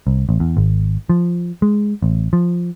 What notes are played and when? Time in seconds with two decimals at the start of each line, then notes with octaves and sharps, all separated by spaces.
0.07 C2
0.29 A1
0.40 E2
0.57 G#1
1.10 F3
1.62 G#3
2.02 A1
2.33 F3